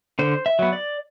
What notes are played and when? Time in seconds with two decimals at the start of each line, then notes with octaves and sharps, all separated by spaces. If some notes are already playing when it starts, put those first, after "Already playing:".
0.19 D3 C5
0.46 E5
0.59 F#3 B3
0.73 D5